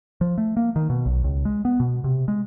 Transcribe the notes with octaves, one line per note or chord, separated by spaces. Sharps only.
F3
A3
A#3
D#3
B2
B1
C#2
G#3
B3
B2
C3
G#3